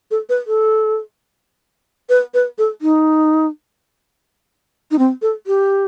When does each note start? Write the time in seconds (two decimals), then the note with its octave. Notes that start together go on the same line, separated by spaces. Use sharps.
0.11 A4
0.29 B4
0.47 A4
2.09 B4
2.34 B4
2.58 A4
2.82 D#4
4.91 D#4
4.99 C4
5.22 A4
5.47 G4